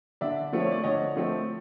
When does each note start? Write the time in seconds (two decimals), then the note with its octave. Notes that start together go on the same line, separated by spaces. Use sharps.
0.21 D3 D5 E5
0.53 F3 A3 C4
0.60 C#5
0.72 D5
0.84 D3 C#5 D#5
1.16 F3 A3 C4